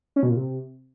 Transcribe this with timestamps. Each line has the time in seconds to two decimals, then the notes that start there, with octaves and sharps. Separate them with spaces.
0.16 C#4
0.23 B2
0.30 A#2
0.36 C3